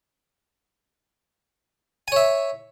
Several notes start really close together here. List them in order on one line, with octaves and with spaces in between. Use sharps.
G#5 C#5 E5